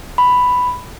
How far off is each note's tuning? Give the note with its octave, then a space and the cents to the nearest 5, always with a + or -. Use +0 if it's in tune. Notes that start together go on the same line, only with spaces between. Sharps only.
B5 +5